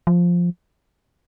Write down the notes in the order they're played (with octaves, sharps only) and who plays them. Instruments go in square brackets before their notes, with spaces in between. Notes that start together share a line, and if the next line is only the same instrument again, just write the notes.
[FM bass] F3